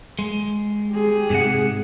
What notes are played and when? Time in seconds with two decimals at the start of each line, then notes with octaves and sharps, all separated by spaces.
0.19 G#3
0.91 G4 G#4
1.30 G#2 C3 F#5